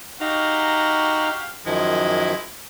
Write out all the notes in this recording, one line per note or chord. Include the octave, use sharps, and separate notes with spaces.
D#4 F#4 G4 F5 A#5
F#2 D#3 F3 G#3 E4